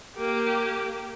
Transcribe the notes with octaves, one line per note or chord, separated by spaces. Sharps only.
A#3 G4